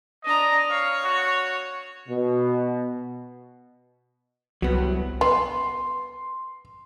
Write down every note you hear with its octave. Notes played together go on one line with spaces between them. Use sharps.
D4 D#5 A#5
C#5 F5
F#4
B2
C2 F#3 B3
B3 C6